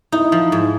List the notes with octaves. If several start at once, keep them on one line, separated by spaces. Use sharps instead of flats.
D#4 E4
F3
G#2